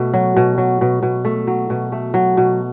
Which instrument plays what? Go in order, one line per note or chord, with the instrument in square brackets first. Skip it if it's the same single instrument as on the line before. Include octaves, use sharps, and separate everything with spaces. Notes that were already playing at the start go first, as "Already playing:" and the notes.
Already playing: [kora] B2 A3
F#3
B2
F#3
B2
B2
A3
F#3
B2
A3
F#3
B2